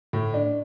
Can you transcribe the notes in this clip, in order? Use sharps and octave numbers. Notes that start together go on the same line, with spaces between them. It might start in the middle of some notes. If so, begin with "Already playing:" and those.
A2
D4